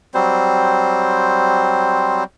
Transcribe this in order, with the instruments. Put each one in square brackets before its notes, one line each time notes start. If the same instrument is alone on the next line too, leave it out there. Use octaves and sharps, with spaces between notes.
[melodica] F#3 G3 C4 C5